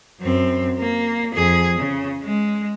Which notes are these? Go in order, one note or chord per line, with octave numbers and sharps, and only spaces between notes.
F#2 C4
A#3
F2 G#4
C#3
G#3